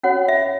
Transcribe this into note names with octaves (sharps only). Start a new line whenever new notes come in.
C#4 F#4 C#5 F#5
E5